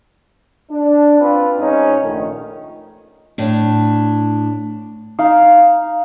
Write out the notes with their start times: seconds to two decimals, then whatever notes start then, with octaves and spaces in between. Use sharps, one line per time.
0.71 D4
1.20 C4 F4 B4
1.59 G#2 C#4 D#4
2.03 A#1 D#3 A3
3.38 A2 D4
5.19 D#4 F5